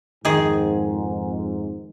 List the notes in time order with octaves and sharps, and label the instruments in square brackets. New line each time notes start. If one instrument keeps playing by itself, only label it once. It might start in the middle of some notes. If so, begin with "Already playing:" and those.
[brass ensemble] F2 G#2 [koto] D#3 G#4